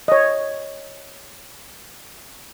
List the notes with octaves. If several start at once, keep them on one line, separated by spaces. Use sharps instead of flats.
C#5 D#5